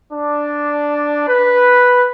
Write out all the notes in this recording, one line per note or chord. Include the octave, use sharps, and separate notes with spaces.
D4
B4